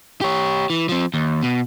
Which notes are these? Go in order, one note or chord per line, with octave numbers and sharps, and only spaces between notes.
G4 C#5
E3
F3 C4
D#2
B2